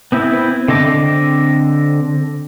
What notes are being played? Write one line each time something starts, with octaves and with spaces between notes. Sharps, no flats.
B3 C4 E4
D3 C4 D#5 D6